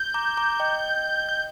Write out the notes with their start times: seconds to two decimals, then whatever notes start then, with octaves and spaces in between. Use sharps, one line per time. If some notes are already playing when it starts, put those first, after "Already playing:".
Already playing: G6
0.14 A#5 D6
0.37 A#5 D6
0.60 D#5 G5
1.29 G6